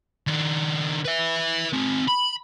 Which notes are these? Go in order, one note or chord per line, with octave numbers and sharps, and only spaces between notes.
D#3 D4
B4 E5
C4 D#4
B5